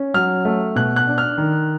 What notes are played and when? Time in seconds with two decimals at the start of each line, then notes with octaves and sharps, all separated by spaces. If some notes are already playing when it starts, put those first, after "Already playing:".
Already playing: C#4
0.14 F#3 F6
0.45 A3
0.76 B2 F#6
0.96 F#6
1.07 D4
1.18 F6
1.38 D#3